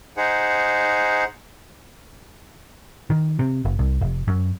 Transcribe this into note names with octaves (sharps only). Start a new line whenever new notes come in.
D#4 G#4 C5 F#5
D#3
C3
F#1
C2
F1
F#2